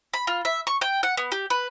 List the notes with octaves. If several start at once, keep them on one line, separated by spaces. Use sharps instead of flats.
B5
F4
E5
C#6
G5
F#5
B3
G4
B4